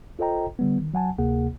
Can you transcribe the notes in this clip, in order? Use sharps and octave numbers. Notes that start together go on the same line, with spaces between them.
F4 A4 C5 D#5 G5 A#5
D3 G3 B3
D#3
F#3 F#5 G#5 A5
D2 C3 A#3 G#4 F#5